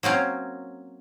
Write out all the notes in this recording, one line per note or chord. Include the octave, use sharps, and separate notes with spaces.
F#3 A#3 C4 C#4